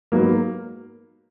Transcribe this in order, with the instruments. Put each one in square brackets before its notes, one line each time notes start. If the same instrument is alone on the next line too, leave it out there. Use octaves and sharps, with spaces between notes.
[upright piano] G#2 F#3 B3 [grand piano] A#3